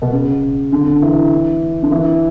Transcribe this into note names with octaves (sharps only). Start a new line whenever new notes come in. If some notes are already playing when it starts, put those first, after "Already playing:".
B2
C#3
D3
D3
E3
D3
E3